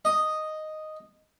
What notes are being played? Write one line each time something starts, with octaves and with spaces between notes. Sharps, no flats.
D#5